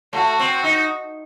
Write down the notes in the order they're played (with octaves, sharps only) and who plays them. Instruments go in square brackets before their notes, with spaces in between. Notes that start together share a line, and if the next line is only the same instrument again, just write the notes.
[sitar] A3 [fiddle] F#4
[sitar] C4
D#4